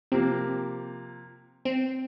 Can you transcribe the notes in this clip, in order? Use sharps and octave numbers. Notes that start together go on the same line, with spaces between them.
C3 F3 A#3 C4
C4